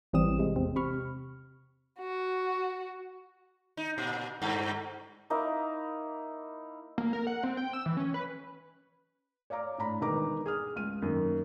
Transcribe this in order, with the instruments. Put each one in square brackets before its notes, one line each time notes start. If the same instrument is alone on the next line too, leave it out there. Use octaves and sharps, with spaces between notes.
[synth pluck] A1 E3 G3 C4 D#6 E7
C3 G#3
E2 C4
C3 B5 C#6 F6
[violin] F#4
[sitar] D#4
A#2
G2
[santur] A#3 D#4 E4
[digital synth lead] A#3
A#4
F#5
C4
G5
E6
E3
C#4
B4
[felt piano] C#5 D5 F5 A#5 D6
A2 D4 A#5 B5
E1 D#3 B4 A#5 D6
G#4 D#6 F6
C#2 F6 D#7
F#2 D#3 A#3